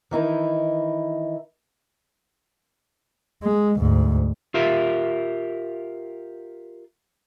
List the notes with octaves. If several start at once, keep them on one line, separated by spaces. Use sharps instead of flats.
D#3 E3 D#4 E4
G#3
D2 G#2
F4 G4 A#4 E5